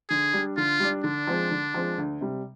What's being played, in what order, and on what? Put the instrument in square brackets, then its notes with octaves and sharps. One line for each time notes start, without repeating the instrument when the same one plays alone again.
[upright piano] D3 [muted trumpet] G#4
[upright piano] G3 D4
[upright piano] D3 [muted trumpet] F4
[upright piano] G3 D4
[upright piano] D3 [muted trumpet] D4
[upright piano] F3 G#3 C4
D3
F3 G#3 C4
D2
C3 G3